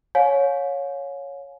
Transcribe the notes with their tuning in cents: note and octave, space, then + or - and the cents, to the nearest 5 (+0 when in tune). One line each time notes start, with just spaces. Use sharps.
C#5 +0 F5 +35 G#5 +25